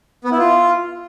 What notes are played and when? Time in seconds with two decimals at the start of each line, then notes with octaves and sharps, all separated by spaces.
0.24 B3
0.31 E4
0.39 F4